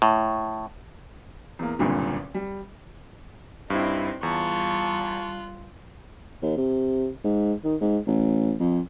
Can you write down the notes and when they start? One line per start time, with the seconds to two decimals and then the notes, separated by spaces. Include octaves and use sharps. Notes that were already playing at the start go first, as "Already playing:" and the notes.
0.02 A2
1.59 E2 A#3
1.79 F#1 C2 G2 A#2 D3
2.34 G3
3.70 G2 C4 D#4 E4
4.23 E2 G3 F4 A5 C#6 F#6
6.42 D#2
6.57 C3
7.24 G#2
7.64 D#3
7.80 G#2
8.07 A1
8.60 F2